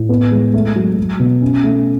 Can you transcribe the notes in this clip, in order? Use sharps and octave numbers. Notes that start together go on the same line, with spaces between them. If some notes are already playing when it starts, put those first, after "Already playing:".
Already playing: A2
B3
G#3
A3
F#3
F#3
B2
C#4
A3